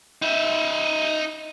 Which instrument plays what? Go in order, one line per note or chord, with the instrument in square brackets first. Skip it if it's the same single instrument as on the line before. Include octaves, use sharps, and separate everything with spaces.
[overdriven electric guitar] D#4 E5